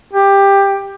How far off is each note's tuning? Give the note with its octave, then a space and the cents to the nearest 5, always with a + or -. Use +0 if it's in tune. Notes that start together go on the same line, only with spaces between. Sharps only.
G4 +15